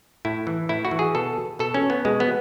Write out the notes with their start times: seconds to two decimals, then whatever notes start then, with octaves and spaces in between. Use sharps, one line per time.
0.25 A2 E4
0.47 E3
0.69 A2 E4
0.85 F#4
0.91 E3
0.99 G#4
1.15 B2 A4
1.59 B2 A4
1.74 C#4
1.90 B3
2.05 B2 G#3
2.20 B3